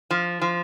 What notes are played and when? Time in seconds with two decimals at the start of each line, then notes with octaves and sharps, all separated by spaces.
0.11 F3
0.41 F3